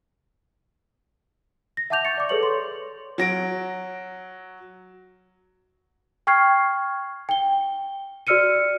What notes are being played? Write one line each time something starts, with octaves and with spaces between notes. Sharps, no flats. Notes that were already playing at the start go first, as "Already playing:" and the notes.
A#6
E5 F#5 A5 D6 G6 F7
C#6 A6 C#7
D5 D6
G#4 A4 B4 C#5 C#6 F#7
C6
F#3 A#6 D7
G5 C#6 F6 G#6 C7
G5 G7
F#4 D5 E6 F6 C#7 D#7